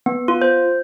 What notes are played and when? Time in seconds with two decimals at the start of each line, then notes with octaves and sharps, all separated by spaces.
0.06 B3
0.28 F4
0.42 C5